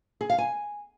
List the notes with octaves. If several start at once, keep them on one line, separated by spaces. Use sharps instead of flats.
G#4
F5
G#5